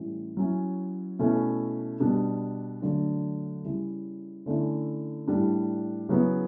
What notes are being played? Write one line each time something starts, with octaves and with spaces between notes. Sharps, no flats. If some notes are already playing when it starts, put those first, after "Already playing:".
Already playing: A2 E3 G3 C#4
F#3 C#4 E4
B2 A3 C#4 E4
B2 G3 D4
D3 F#3 A3 D4
C#3 G3 C#4 E4
D3 A3 C#4 E4
A2 G3 D4
C#3 F#3 B3 E4